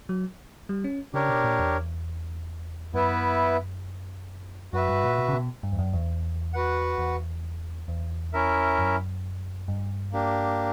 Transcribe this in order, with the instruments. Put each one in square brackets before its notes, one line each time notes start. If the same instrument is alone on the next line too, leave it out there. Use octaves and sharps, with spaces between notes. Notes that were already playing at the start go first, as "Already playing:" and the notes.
[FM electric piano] F#3
G3
C#4
[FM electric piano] C#3 [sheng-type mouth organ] D4 G4 A#4 C#5
[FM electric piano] B2
A#2
E2
[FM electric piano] F#2 [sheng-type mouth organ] B3 E4 B4 E5
[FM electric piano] F#2 [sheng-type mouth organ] F#4 B4 E5
[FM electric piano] G2
A#2
B2
C#3
B2
G2
E2
F#2
E2
[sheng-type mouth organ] F#4 B4 F#5
[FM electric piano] E2
E2
[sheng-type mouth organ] C#4 E4 A#4 E5
[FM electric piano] F#2
G2
[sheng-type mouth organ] A#3 D4 G4